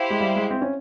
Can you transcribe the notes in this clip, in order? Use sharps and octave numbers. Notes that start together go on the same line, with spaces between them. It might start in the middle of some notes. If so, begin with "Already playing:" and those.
Already playing: E4 G4 C5 F5
G#3
G3
G#3
C4
C#4